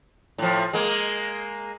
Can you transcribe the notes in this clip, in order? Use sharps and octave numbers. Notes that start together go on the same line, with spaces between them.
A2 F3
G#3 A#3